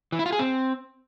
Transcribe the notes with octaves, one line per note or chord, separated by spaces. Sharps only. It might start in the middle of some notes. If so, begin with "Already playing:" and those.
E3
E4
F4
G#4
C4